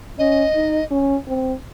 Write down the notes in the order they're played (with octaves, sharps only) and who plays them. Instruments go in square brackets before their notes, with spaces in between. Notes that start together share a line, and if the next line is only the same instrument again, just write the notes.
[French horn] C#4 [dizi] D#5
[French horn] D#4
C#4
C4